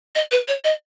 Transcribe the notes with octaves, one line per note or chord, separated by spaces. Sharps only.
D#5
B4
C#5
D#5